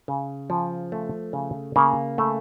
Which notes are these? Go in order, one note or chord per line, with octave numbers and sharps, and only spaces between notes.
C#3
F3
A3
C#3
C#3 A#3
A3